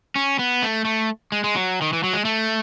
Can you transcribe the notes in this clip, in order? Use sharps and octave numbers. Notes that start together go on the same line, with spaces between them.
C#4
B3
A3
A3
G#3
G#3
F#3
D#3
E3
F#3
G#3
A3